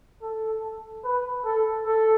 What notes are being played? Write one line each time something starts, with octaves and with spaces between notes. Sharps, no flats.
A4
B4
A4
A4